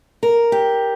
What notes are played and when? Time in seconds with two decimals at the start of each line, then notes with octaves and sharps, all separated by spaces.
0.23 A#4
0.52 G4